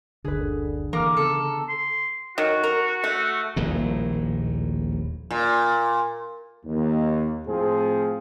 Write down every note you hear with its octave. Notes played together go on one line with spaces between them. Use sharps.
F#1 D2 D3 G#4 B4
E3 A#3 A#5 D6 F6
C#3 B3 A4
C6
D#3 F#3 F#4
A#4
A3
D#1 A#1 A2
A#2
D#2
A2 F3 C4 G#4